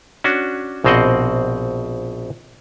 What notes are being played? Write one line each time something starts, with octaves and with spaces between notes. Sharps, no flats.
C#4 D4 F#4
A#1 B2 C4 C5 D#5 F#5